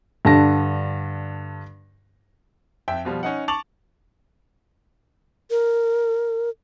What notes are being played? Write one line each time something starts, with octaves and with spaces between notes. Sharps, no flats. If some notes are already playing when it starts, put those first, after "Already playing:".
G2 D3 A5 A#6
F2 E5 G5
B2 F3 G3
C#4 D#4 F#5
A5 C#6 D6 A6 F7 F#7
A#4